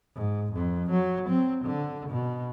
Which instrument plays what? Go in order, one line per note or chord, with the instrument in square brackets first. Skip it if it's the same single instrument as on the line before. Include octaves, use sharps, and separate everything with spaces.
[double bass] G#2
F2
F#3
C4
D3
B2